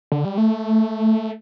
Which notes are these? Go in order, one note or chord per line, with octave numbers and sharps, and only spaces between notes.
D3
G3
A3